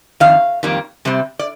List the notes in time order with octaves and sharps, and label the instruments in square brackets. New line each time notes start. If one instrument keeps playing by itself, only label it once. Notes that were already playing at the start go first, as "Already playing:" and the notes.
[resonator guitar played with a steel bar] F2 D#3 F5
F2 D#3 G3 A#3
C3 G3 C4
D5